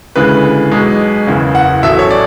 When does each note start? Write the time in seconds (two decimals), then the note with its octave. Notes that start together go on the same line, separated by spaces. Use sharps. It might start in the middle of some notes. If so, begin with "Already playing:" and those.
0.16 D2 C#3 E3 G#3 B4
0.71 B1 B2 G#3
1.27 F#1 E2 C#3
1.55 F#5
1.83 A1 A2 F#3 A3 E5
1.99 C#5
2.10 D5